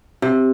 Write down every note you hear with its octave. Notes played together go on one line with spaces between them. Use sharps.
C3